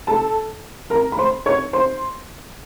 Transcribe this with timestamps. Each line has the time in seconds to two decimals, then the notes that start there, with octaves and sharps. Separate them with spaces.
0.07 A4 A5
0.90 A#4 A#5
1.12 B5
1.18 C5 C6
1.46 C#5 C#6
1.73 C5 C6